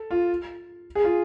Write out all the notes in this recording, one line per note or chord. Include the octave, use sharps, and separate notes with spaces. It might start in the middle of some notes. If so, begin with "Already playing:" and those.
Already playing: A4
F4
G#4
F4